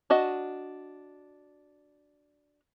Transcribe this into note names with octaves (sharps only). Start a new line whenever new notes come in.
D4 F#4 D#5